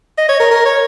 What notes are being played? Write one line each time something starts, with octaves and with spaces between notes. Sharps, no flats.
D#5
C#5
A#4
A#4
C#5